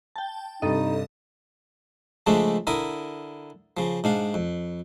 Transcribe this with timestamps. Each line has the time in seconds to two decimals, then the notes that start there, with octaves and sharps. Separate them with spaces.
0.16 G5 A5
0.62 G2 C3 D#4 A4 D#5
2.27 C#3 F3 G#3 A3 D4
2.67 D3 E4 A#4 D#6
3.77 C#3 F3
4.04 G#2 D4 F5
4.34 F2